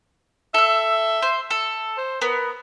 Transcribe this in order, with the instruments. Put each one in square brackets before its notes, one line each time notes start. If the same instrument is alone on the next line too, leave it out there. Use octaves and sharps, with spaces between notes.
[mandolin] A4 E6 [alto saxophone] E5
[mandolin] C5
A4
[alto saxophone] C5
[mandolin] B3 [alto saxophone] A#4